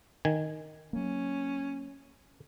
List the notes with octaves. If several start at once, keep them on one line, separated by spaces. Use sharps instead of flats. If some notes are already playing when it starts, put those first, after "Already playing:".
D#3 G#5
F#3 A#3 C#4